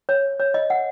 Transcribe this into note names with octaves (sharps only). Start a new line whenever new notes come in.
C#5
C#5
D#5
F#5